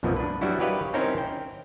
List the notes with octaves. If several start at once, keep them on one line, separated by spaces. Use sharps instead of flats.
C2 F#2 B2 E3 F3 A#3
D4 B4
F#3 G3 D4 E4 F#4
G4 A#4 B4 C#5 D#5 F5
C4 C#4 D#4 E4 A#4 C5
G5